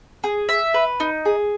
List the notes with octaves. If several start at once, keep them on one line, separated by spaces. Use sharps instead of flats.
G#4
E5
B4
D#4
G#4